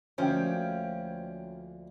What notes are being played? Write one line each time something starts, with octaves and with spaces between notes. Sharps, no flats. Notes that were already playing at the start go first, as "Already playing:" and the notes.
D2 F3 A#3 C#4 G4 C5 G5